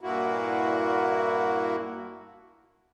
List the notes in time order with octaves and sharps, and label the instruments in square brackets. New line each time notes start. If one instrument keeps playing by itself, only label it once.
[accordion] G2 A#2 A#3 E4 F#4